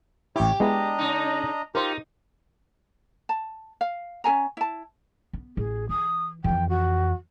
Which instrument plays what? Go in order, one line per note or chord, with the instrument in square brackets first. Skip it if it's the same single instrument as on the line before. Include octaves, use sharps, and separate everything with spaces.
[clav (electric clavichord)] A1 E4 [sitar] G4 [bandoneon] C#5
[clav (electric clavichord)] G#3 B3 E4 [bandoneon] D4 D#5 A#5
[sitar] C#3 D#4
[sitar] D#4 [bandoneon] F4 G4 [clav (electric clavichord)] A#4 C5
[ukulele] A5
F5
C#4 A4 G#5 A#5
E4 A5
[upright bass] B3
[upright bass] A1 [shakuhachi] G#4
[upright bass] E3 [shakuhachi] D#6
[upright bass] F2 E3 [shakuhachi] G5
[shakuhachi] F#4